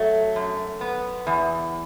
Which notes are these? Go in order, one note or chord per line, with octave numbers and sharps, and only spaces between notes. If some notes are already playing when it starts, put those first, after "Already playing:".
Already playing: F#3 A3
F#2
B3
E2